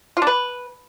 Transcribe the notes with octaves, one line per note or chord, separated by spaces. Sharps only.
F4
D4
B4